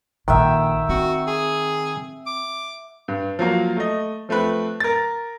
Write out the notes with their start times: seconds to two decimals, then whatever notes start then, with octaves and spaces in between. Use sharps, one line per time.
0.28 A#1 A#2 D#3 E5 F#5 G5
0.89 C4 F#4
1.27 G#4
2.27 D6
3.08 G2
3.39 F3 F#3 A#3
3.77 A3 D#5
4.29 F3 A3 C4 B4
4.80 A#4 A6